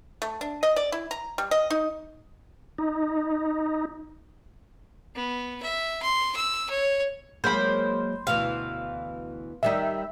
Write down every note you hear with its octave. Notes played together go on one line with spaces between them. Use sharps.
A3
D4
D#5
D5
E4
A#5
G3
D#5
D#4
D#4
B3
E5
C6
E6
C#5
F#3 G#3 A#3 C5 B5
D2 B2 E3 F5
D#3 G3 D#4 E5